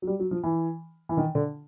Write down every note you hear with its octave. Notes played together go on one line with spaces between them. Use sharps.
F#3
G3
F#3
F3
E3
E3
D#3
D3